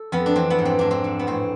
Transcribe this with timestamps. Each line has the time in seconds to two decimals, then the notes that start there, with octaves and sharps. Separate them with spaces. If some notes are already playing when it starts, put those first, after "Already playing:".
Already playing: A4
0.12 F2 B3
0.26 D4
0.35 E3 C4
0.50 B3
0.59 G#2
0.65 C4
0.79 G#2 D4
0.91 C4
1.04 G#2
1.19 B3
1.27 A2 C4